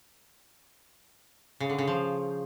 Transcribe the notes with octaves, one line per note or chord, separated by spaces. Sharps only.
C#3
D3
C#3
F3